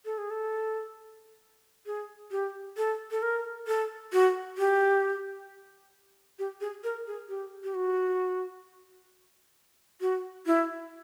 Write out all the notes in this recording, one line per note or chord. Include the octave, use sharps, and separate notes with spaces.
A4
G#4
A4
G#4
G4
A4
A4
A#4
A4
F#4
G4
G4
G#4
A#4
G#4
G4
G4
F#4
F#4
E4